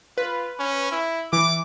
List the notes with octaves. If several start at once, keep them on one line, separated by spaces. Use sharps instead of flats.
F4 B4
C#4
E4
E3 D6